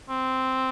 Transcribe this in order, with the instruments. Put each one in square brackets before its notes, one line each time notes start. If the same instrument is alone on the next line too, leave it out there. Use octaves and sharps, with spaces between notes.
[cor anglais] C4